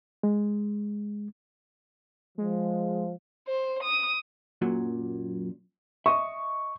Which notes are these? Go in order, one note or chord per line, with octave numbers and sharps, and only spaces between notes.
G#3
F3 G#3
C5
D#6
F#2 A#2 F#3
D#5 E5 C#6